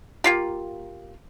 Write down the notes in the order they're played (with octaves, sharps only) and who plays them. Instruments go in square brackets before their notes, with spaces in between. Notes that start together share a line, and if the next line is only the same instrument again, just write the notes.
[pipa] A#3 F4 G4